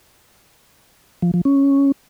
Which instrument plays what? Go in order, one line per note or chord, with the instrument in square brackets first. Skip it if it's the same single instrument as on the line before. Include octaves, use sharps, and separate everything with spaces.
[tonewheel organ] F3
F3
C#4